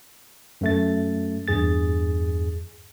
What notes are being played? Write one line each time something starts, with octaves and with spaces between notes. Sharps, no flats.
F#2 A3 A6
E2 G2 G#4 A6